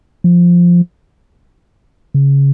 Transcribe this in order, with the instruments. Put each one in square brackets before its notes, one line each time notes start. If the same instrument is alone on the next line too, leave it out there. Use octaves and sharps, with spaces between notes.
[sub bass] F3
C#3